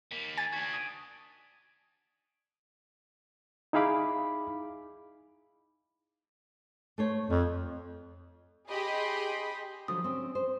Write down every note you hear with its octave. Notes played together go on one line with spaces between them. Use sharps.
D#3 A#3 B6
G#5 A6
D4 F#4 G#6 B6
D#6 D7 D#7
D#4 E4 G#4 F5 B5 D6
A3 C5 C#5
F2 F3
G4 G#4 D#5 G5 B5 C6
D3 F3 F#3 D#6
C4 C#4
C5